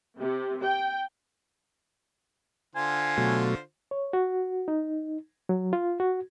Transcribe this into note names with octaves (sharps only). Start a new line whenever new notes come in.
C3
G5
D3 F4 C5 G#5
B2 F#3 A3
C#5
F#4
D#4
F#3
F4
F#4